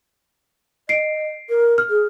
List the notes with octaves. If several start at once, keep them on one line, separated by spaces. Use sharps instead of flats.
D#5 C7 D7
A#4
F6
G#4